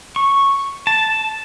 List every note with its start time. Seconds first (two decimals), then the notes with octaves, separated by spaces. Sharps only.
0.16 C#6
0.87 A5